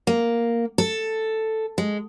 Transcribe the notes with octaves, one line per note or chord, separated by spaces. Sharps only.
A#3
A4
G#3